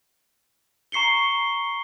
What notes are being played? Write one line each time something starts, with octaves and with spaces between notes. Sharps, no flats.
A#5 C#6 C7 C#7 G7